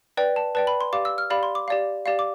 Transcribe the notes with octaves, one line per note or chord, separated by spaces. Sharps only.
B4 D5 G5
A5
B4 D5 G5 A5
B5
C6
G4 D5 F5 D6
E6
F6
G4 D5 F5 B5
C6
D6
G4 D5 F5
G4 D5 F5
D6